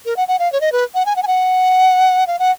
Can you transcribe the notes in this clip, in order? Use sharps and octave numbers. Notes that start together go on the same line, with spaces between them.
A#4
F#5
F#5
F5
C#5
D#5
B4
F#5
G#5
F#5
G#5
F#5
F5
F#5